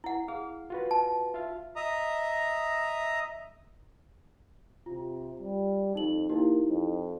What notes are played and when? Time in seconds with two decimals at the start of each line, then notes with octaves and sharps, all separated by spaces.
0.04 E4 F#5
0.28 G#4 F5
0.70 F4 F#4 B4
0.91 A5
1.34 F4 E5 F5
1.76 D#5 E5 A#5 D#6
4.86 C3 F4
5.41 G3
5.95 F2 D#4 F#7
6.30 A#3 D#4 E4 G4
6.69 F2